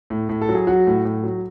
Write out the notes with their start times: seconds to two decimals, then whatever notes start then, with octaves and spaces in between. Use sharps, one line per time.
0.10 A2
0.29 A2
0.41 A4
0.49 F#3
0.55 G#4
0.67 F#3 F#4
0.87 A2
1.05 A2
1.24 F#3